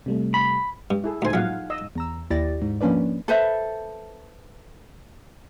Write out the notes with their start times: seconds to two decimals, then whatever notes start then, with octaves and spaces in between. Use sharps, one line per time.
0.06 C3 G3 A3
0.34 B5
0.90 G2
1.04 E4 G#4 A4
1.22 D2 D#4 C5 G#5
1.33 A#1 F#3 F5 F#5
1.70 D#5 E6
1.95 E2 A#5 E6
2.31 D#2 E4 G4 D5 A6 A#6
2.62 G#2
2.81 F3 A#3 C#4 D4 B4 D5
3.28 A4 B4 C5 E5